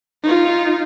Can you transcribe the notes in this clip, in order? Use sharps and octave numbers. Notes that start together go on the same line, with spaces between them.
D#4 F4